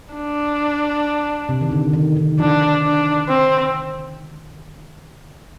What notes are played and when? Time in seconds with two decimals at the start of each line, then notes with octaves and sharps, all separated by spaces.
0.14 D4
1.49 C3
1.61 D#3
1.72 D3
1.93 D#3
2.17 D#3
2.39 F3 D4
2.83 D4
3.28 C4